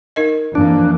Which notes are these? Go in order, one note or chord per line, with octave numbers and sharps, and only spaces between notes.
D#4 A#4 D#5
F2 E3 A#3 D4